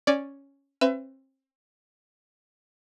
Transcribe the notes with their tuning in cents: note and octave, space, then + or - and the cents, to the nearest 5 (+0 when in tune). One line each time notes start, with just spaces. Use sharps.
C#4 +0 D5 +0
C4 +35 B4 +35 E5 +30